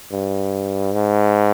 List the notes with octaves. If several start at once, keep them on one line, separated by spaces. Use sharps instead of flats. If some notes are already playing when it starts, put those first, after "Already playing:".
G2
G#2